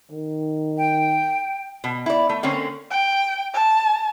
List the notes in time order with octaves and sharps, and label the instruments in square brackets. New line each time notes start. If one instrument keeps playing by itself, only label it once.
[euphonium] D#3
[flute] G5
[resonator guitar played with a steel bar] B2
E4 D5
A3
D3 A#3 C4 C#4
[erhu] G5
A5